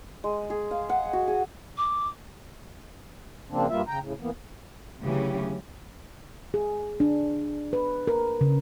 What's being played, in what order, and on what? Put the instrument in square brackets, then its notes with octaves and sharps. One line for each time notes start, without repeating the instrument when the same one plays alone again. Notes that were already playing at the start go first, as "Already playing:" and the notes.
[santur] G#3
G#4
F5
F#5
F#4
G#4
[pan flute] D6
[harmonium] C#3 F3 A#3 C4 D4
G2 G3 A#3 F4 E5
C#3 G5 A#5
A2 C#3
E3 A#3 B3
[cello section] D2 C#3 E3 F#3 C#4 G4
[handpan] G#4
D4
B4
A#4
C#3